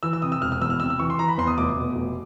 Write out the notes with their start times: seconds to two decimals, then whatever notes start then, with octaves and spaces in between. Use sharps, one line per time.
0.03 E3 E6
0.13 E6
0.22 C3 D#6
0.32 E6
0.42 E1 F6
0.52 F6
0.61 E2 E6
0.70 F6
0.80 C3 E6
0.90 E6
0.99 E3 C#6
1.10 C6
1.19 E3 A#5
1.28 B5
1.38 E2 C6
1.47 D#6
1.58 F1 D6
1.77 B2
1.96 F1